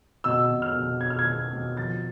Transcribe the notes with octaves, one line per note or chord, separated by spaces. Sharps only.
B2 E6
B2
F6
B2
B2 G#6
F6
G#6
B2
B2
F3 A6